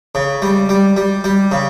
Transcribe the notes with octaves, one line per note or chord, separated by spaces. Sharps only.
C#3
G3
G3
G3
G3
C#3